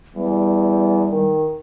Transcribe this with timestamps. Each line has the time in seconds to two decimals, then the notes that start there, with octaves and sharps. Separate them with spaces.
0.15 E2 G3
1.10 D#3